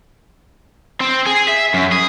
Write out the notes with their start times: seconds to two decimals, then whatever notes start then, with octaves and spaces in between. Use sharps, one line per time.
1.01 C4
1.27 G#4
1.48 E5
1.74 F#2
1.92 G#4